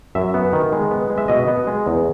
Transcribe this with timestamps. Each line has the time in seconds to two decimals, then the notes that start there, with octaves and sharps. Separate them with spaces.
0.15 F#2 E5
0.34 B3
0.53 D#3
0.72 G#3
0.91 B3
1.10 G#3
1.18 E5
1.28 B2 D#5
1.48 B3
1.67 G#3
1.86 E2